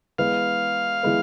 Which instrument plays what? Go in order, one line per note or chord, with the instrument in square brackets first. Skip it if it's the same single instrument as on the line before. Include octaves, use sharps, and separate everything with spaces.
[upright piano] E3 G#3 B3 [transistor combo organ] F5
[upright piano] E3 G#3 B3